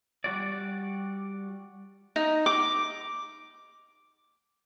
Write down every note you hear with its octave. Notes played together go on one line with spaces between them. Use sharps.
G3 F#4 D5
D#4
D6